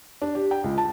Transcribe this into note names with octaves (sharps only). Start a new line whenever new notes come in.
D4
G4
G5
C#2
A5